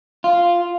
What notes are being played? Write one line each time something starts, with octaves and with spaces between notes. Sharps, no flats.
F4